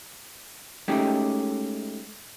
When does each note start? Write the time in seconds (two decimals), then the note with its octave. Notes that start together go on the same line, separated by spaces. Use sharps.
0.88 G#3 A3 C#4 D#4 G4